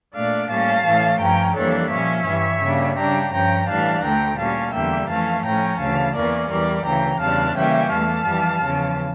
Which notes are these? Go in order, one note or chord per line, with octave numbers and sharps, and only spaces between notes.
A#2 A3 D4 D5 F5
A2 G3 A#3 C#4 F5 A5
A2 E3 A3 C#4
G2 F3 C#4 G5 A#5
F2 E3 G3 A#3 D4 A4 C#5
A#2 F3 C#4 C#5 E5
G2 E3 G3
C#3 G3 A#3 D4
C#3 G3 D4 G5 A#5
G2 F3 C#4 G5 A#5
A2 E3 G3 D4 F5 A5
D2 D3 A3 G5 A#5
A#2 G3 C#4 F5 A5
E2 D3 G3 A#3 E5 G5
F2 E3 A3 C#4 F5 A5
A2 F3 C#4 G5 A#5
D2 C#3 E3 F5 A5
E2 E3 A#3 C#4 A#4 D5
E2 E3 G3 A#4 D5
D2 C#3 E3 G5 A#5
E2 C#3 G3 D4 F5 A5
C#3 E3 G3 A#3 C#4 E5 G5
E2 E3 A3 F5 A5
F2 E3 G3
E2 C#3 F3